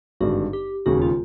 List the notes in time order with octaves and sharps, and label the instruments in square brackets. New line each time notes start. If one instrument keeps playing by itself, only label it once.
[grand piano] G#1 G2 D3 [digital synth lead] F#4
[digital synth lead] G4
[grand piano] E1 D#2 C#3 [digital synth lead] F#4
[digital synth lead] F4